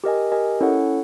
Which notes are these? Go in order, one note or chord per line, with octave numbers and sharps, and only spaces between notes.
G4 A#4 D#5 G#5
G4 A#4 D#5 G#5
C#4 E4 A4 C#5 F#5